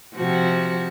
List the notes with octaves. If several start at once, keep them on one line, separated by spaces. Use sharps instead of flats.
C3 F3 F#4